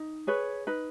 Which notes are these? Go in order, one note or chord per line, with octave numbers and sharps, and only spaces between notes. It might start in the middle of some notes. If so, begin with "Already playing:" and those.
Already playing: D#4
G#4 B4 C#5
D#4 B4